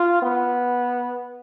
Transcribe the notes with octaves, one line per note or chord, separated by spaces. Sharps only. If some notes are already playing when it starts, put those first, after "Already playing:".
Already playing: F4
B3